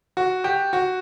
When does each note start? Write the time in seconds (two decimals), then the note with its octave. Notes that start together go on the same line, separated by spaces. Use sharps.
0.17 F#4
0.44 G4
0.73 F#4